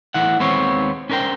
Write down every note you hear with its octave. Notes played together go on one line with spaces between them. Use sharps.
A2 E3 E4 F#5
D#2 G#3 B3 C4 C#5
C#4 D4 A#4 C5 G5